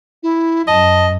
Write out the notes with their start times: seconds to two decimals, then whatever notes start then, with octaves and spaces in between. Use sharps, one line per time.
0.23 E4
0.67 F#2 D#5 A5